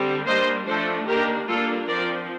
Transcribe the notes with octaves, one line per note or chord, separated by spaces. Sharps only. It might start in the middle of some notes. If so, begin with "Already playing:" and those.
Already playing: D3 G3 C4
G3 A#3 D4 C5 D#5
F3 A3 D4 A4 C5
D#3 A#3 D4 G4 A#4
G3 A#3 D4 F4 A4
F3 C4 A#4 D5